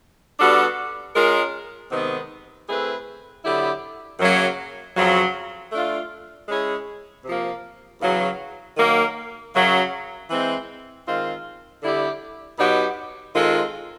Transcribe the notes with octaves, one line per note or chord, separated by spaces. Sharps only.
G3 B3 D4 F#4 A4
G#3 C#4 F4 A#4
C3 D#3 G#3 B3
A3 C4 E4 G#4 B4
D3 F#3 B3 E4 G4
F#2 C#3 F#3 A#3 C#4
F2 C#3 F#3
A3 D4 F4
G#3 C#4 E4 G#4 C#5
C3 F3 A#3
E2 C#3 F#3
D#3 F#3 A#3
F#2 C#3 F#3
E3 G#3 C4
D#3 G#3 C4 F4
D3 G3 B3 E4 G4
B2 F#3 B3 D#4 G4
D#3 G#3 C4 F4 A4